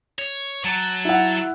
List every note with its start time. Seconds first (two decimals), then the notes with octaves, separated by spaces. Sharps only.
0.19 C#5
0.65 F#3 A5 G#6 A6
1.05 E4 F#5